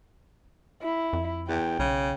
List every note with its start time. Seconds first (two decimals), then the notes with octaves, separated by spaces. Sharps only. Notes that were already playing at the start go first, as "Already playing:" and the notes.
0.82 E4
1.13 F2
1.48 E2 G5
1.79 B1 C#3